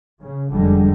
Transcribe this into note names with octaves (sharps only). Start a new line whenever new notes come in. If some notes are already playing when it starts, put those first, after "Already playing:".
C#3
F1 F2 D3 G3 G#3